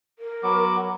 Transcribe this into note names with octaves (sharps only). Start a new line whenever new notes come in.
A#4
F#3 B3 D6